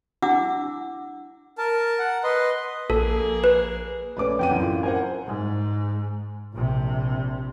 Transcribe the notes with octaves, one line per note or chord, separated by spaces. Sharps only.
D4 E4 F#5 D6 E6
A#4 A5
F#5
B4 D#5 C6
A#1 A#3 G#4 A4
B4
A#1 A3 C#4 B4 D5 D6
F2 F#5 G5 D#7
F#2 A2 E4
F4
A#4 C5 F#5 G#5
G#2
A#1 C3